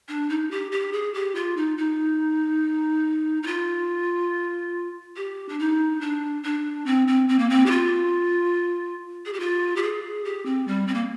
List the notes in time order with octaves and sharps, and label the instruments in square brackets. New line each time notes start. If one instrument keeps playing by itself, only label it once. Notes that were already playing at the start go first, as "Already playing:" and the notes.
[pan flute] D4
D#4
G4
G4
G#4
G4
F4
D#4
D#4
D#4
F4
G4
D4
D#4
D4
D4
C4
C4
C4
A#3
C4
G4
F4
G#4
G4
F4
G4
G#4
G4
C4
G3
C4
A#3